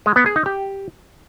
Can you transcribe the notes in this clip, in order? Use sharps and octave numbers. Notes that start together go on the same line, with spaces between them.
G#3
B3
G#4
D#4
G4